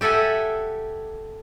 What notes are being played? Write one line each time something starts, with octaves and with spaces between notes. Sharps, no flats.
G4 A4 E5 F#5 G#5